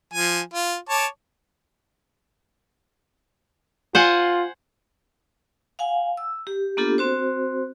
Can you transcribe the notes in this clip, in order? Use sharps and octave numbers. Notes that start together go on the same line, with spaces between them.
F3 G#5
F4
C#5 A5 D6
F4 C5 F#5 G#5
F5 F#5 G#5
E6
G4
A#3 B3 D4 F4 G4 A4
C4 F#4 C5